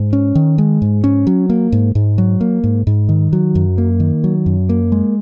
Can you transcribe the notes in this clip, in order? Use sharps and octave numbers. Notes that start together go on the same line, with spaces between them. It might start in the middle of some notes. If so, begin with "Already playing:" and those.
Already playing: G#2
C#4
D#3
G#3
G#2
C#4
F#3
A#3
G#2
G#2
F#3
A#3
G#2
G#2
D#3
F#3
F#2
A#3
D#3
F#3
F#2
A#3
G#3